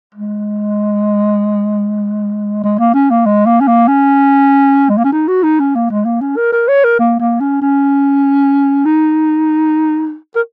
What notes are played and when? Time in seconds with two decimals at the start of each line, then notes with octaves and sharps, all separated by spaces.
0.15 G#3
2.64 G#3
2.79 A#3
2.94 C#4
3.11 A#3
3.26 G#3
3.46 A#3
3.61 C#4
3.68 A#3
3.88 C#4
4.90 G#3
4.98 A#3
5.04 C#4
5.12 D#4
5.28 F#4
5.43 D#4
5.60 C#4
5.75 A#3
5.91 G#3
6.05 A#3
6.21 C#4
6.37 A#4
6.52 A#4
6.68 C#5
6.84 A#4
6.99 A#3
7.20 A#3
7.40 C#4
7.62 C#4
8.85 D#4
10.36 A#4